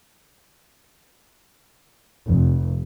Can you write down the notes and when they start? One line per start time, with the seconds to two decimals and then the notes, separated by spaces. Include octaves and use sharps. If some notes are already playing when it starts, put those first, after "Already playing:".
2.27 F1